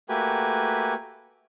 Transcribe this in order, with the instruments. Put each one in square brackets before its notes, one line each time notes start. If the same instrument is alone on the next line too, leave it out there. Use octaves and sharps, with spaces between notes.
[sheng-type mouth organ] A3 A#3 F#4 G4 B4 G#5